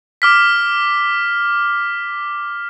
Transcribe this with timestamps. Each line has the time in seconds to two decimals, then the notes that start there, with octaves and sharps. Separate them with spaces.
0.22 D6 F6 B6